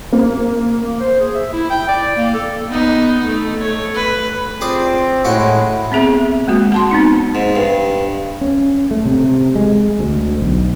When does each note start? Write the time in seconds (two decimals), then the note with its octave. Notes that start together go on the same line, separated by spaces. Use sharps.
0.13 A#3
0.84 A#3
1.00 C5
1.20 G#4
1.35 E5
1.53 E4
1.70 G5
1.88 D5
2.17 A#3
2.34 A4
2.69 B3 D#4
3.25 A3
3.59 A3 C#5
3.95 B4
4.61 C4 F4 G#4 D5
5.25 A2 G#3 C#4 E4 F#4 G5
5.92 B3 C4 G#4 E5
6.48 G#3 A#3 F#4
6.72 F#5 A5 C6
6.91 B3 C4 D#4
7.35 G#2
7.56 G2
8.41 C#4
8.91 A3
9.05 C3
9.56 G#3
9.99 D2
10.41 B1